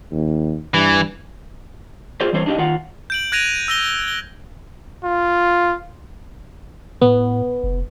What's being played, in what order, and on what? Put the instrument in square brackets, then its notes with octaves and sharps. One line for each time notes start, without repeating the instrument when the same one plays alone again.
[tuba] D#2
[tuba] G2 [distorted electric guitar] E3
[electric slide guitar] F4 G4 G#4 C5 D5
E3 G3 C4 C5 C#5
D4 D#4 F4 G4 D#5
D#3 F4 F#5
[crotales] G6 D7 F#7
F#6 G#6 A#6 D7 D#7 F7
E6 A#6 G7
G7
[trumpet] F4
[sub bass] A2 [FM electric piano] B3
[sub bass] F1